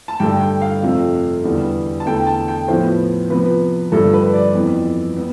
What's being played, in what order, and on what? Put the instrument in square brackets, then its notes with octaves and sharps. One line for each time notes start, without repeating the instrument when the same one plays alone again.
[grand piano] A5
G2 D3 A3 G5
G5
F5
F2 C3 F3 A3
E2 D3 G3 B3
A5
E2 D3 A3 G5
A5
G5
A2 F3 B3 C5
C3 F3 B3 B4
G2 D3 F3 A3 A4
B4
D5
F2 E3 B3
B3